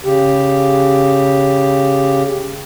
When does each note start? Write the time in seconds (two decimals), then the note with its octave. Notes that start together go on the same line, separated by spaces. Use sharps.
0.04 C#3 G4